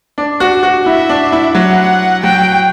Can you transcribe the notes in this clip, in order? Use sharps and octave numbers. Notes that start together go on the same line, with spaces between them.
D4
F#4
F#4
E4 E5
D4
E4
F#3 F#5
F#3 G5